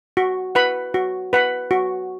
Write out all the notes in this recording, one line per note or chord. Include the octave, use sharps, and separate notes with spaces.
F#4
B4 F#5 B5
F#4
B4 F#5 B5
F#4